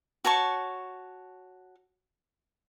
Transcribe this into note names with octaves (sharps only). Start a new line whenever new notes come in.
F#4 C#5 A5 C#6